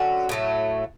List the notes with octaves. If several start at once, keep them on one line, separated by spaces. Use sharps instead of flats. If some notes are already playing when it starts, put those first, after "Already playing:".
Already playing: D3 F#3 C#4 F#4
A2 F#3 A3